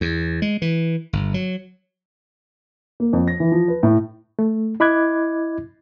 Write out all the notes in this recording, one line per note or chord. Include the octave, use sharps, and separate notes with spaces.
E2
G#3
E3
G1
F#3
A#3
F2
A#6
E3
F3
B4
A2
A3
E4 D#5 B5 D6 F#6 G#6